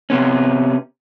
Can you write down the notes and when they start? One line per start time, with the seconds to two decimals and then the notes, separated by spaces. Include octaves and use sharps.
0.10 C3 B3 C#4